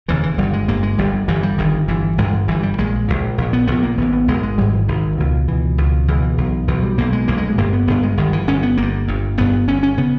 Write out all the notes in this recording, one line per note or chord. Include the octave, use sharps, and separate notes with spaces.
E1 D#2 C#3 E3
E3
G1 G2 G3
G#3
G1 G2 A#3
G#3
G1 G2 G3
G1 G2 E3
G3
G1 G2 D#3
G1 G2 E3
G1 G2 G#3
G1 G2 E3
G3
A#1 A#2 G#3
A#1 A#2
A#1 A#2
B3
A#1 A#2 B3
A#3
G#1 G#2 B3
B3
G#1 G#2 G#3
G#3
G#1 G#2 G3
E3
G#1 G#2 D#3
C#2 B2
C#2 B2 E3
C#2 B2
C#2 B2 E3
B1 B2
B1 B2 E3
G3
B1 B2 A#3
G#3
B1 B2 A#3
G#3
G#3
G1 G2 A#3
B3
G1 G2 B3
G#3
G1 G2 D#3
E3
G1 G2 C#4
B3
G1 G2 A#3
G1 G2
G1 G2 B3
G1 G2 C#4
C#4
C#3 B3